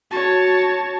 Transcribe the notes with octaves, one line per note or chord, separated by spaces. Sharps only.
F#4 C#5 A5